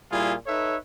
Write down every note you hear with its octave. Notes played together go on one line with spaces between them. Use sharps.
A#2 G3 E4 F4 G#4
D#4 A4 B4 C#5 E5